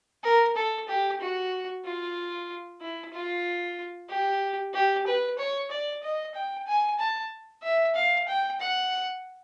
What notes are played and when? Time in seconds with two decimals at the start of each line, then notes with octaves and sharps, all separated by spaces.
0.24 A#4
0.56 A4
0.88 G4
1.21 F#4
1.85 F4
2.81 E4
3.13 F4
4.10 G4
4.74 G4
5.06 B4
5.38 C#5
5.70 D5
6.03 D#5
6.35 G5
6.67 G#5
6.99 A5
7.63 E5
7.95 F5
8.28 G5
8.60 F#5